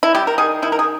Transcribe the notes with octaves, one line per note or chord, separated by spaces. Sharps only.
E4
G3 G4
A#4
D#3 G#4
D#3 E4
A#4
G#4